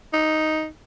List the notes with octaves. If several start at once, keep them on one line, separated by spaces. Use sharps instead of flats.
D#4